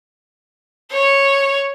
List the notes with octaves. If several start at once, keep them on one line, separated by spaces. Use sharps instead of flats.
C#5